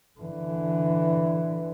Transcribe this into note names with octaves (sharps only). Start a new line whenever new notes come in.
D3 E3